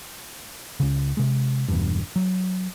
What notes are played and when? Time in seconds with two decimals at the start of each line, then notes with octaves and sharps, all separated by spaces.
0.80 C#2 C#3
1.17 C3 G#3
1.69 E1 E2 G2
2.16 F#3